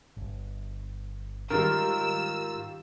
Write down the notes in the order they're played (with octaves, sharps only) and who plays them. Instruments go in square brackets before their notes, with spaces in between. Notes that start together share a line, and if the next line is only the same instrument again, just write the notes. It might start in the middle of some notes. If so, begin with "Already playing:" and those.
[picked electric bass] G1
[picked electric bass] G#2 [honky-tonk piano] D#3 G3 [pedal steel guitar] F4 A#4 [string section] E6